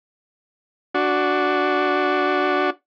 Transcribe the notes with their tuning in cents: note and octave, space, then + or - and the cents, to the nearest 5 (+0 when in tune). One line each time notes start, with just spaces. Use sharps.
D4 -5 F#4 +0